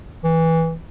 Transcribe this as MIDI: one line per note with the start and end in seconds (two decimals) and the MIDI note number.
0.24 0.77 52